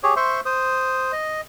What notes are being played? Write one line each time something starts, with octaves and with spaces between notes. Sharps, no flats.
G4 G#4 C#5
C5 E5 C6 C#6
C5 D#6
D#5